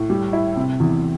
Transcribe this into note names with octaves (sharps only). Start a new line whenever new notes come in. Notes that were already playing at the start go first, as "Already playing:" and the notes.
Already playing: A2
G3
E4
C3
E2